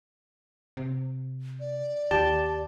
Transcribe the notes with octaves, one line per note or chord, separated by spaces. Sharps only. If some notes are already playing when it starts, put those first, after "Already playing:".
C3
D5
D#2 G4 A5